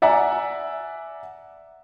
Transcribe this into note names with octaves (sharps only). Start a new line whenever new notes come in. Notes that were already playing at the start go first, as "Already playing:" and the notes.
D5 E5 F#5 G#5 A#5